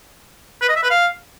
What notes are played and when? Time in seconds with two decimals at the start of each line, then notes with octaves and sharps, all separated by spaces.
0.61 B4
0.69 D#5
0.76 E5
0.83 B4
0.90 F5